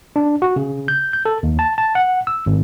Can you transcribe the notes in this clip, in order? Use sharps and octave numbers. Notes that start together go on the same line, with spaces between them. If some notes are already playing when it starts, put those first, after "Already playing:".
D4
F#4
C#3
G6
G6
A4
D#2
A5
A5
F#5
E6
G#1